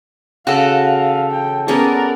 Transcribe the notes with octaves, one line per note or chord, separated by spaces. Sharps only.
C#3 F#4 A4 F5
G5
B3 C#4 G#4 A#4 D5